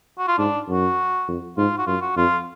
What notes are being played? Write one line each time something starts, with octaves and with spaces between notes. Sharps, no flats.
F#4
F4
G#2 D4
F#2 F#4
F2
G#2 F4
F#4
F#2 F4
F#4
F2 F4